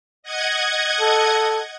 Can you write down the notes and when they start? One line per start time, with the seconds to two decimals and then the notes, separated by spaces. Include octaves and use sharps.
0.23 D#5 F#5 G#6
1.01 A4